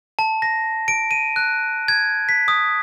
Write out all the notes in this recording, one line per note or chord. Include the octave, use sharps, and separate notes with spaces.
A5
A#6
D7
D#7
F#6
G#6
B6
D#6